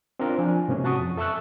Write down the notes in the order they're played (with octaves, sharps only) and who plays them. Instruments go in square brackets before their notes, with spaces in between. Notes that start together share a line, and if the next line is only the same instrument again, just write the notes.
[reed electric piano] C4 D4 F4 A#4
F3 D4 G#5
G#2 C3 A#3 C#4
F#4 F#5 A5 C#6 D#6
F2
A4 E5 A5 C#6 E6 F#6